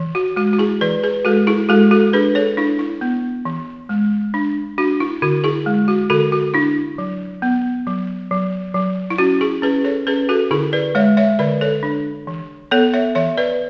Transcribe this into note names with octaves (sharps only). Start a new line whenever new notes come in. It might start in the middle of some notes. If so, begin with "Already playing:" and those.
Already playing: E3
F#4
G#3 F#4
F#4
E4 G#4
E3 B4 D5
G#4 B4
G#3 F#4 A4
E4 G#4
G#3 F#4 A4
F#4 A4
D4 G#4 B4
A4 C#5
D4 E4
E4
B3
E3
G#3
D4
D4 F#4
E4
D3 F#4
E4 G#4
G#3
F#4
D3 F#4 A4
F#4
D4 E4
F#3
B3
F#3
F#3
F#3
E4
C#4 F#4
E4 G#4
C#4 G#4 B4
A4 C#5
C#4 G#4 B4
F#4 A4
D3 E4 G#4
B4 D5
G#3 C#5 E5
C#5 E5
D3 B4 D5
A4 C#5
D4
E3
B3 A4 C#5
C#5 E5
E3 C#5 E5
B4 D5